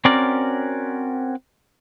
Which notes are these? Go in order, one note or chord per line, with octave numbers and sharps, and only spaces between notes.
C4 C#4 F#4 A#4 D5